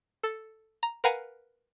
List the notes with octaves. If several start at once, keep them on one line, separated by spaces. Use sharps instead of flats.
A4
A#5
A#4 B4 F5 F#5 G#5 A#5